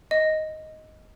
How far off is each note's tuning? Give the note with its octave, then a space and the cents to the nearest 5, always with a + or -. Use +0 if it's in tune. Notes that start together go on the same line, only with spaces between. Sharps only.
D#5 +5